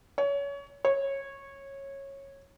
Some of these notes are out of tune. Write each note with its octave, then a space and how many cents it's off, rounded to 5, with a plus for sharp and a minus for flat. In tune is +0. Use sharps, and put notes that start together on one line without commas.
C#5 +25
C#5 -15